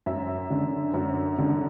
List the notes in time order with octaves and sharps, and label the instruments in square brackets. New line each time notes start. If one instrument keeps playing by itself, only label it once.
[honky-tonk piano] F#2 E5
D3
F#2
D3